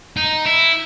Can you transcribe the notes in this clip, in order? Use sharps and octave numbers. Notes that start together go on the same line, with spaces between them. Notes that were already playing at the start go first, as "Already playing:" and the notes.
D#4
E4